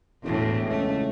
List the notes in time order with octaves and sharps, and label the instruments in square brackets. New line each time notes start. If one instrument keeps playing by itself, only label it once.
[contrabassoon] E1 [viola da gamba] E2 A2
[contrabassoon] C#2 [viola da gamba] A3